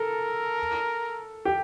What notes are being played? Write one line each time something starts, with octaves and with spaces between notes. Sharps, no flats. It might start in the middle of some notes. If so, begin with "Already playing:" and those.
Already playing: A4 A#4
G4